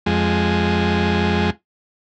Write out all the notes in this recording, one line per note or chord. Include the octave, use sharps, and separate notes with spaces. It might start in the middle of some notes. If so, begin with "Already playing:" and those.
F2 G#3